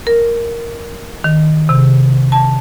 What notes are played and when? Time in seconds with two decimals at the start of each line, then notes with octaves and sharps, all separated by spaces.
0.07 A#4
1.24 D#3
1.69 C3
2.32 A5